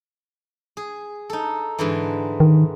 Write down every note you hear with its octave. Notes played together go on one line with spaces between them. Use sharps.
G#4
D#4 A4
G#2 D3 E3
D#3